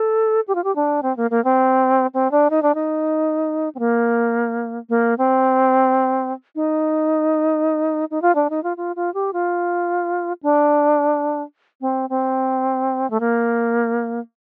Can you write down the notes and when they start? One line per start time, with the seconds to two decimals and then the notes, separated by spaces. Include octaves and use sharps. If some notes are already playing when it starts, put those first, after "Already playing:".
Already playing: A4
0.48 G4
0.55 F4
0.64 G4
0.76 D4
1.03 C4
1.17 A#3
1.31 A#3
1.44 C4
2.14 C4
2.31 D4
2.50 D#4
2.62 D4
2.75 D#4
3.75 C4
3.79 A#3
4.89 A#3
5.18 C4
6.55 D#4
8.11 D#4
8.22 F4
8.35 D4
8.50 D#4
8.63 F4
8.77 F4
8.96 F4
9.14 G4
9.33 F4
10.43 D4
11.81 C4
12.10 C4
13.10 A3
13.20 A#3